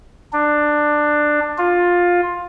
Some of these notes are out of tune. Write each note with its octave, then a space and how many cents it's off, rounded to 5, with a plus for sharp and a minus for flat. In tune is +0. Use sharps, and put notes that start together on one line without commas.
D4 +15
F4 +15